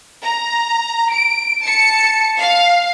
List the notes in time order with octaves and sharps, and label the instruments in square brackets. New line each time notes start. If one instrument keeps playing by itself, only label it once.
[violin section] A#5
D7
A5 C#7
F5